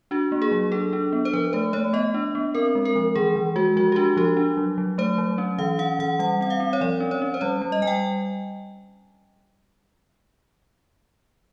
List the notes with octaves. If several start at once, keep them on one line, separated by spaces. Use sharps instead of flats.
D4 F#4
A#3
G#4
F#3
D4 A4
D4
B3
C5
F3 B4
A3 C5
A3 C#5
B3 D#5
D4
B3
C4 A#4
G#3
A#4
F3
E3 G#4
E3
G#3 F#4
F3 F#4
G4
D4 F#4
F3 G4
D4
F#3
F#3
A3 C5
F#3
C#4
E3 F5
C#4 F#5
E3 F#5
G3 F#5
C4 F#5
F5
C4
C#5
F3 D5
C#4
C#5
C#4
C5
G3 C#5
G3
D#5
G3 G#5
G5